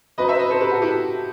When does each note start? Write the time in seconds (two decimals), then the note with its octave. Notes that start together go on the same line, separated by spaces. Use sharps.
0.18 F#2 F#3 C4 B4 D#5
0.28 C5 E5
0.39 B4 D#5
0.50 A4 C5
0.61 G4 B4
0.71 F#4 A4
0.82 E4 G4